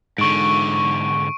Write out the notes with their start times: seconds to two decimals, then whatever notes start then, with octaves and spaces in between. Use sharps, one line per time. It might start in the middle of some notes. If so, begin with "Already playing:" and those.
0.18 G#2 D3 C#6 D7